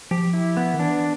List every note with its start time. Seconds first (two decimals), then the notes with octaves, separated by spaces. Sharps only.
0.11 F3 G4
0.33 E4
0.57 B3
0.74 D#3
0.79 E3 D4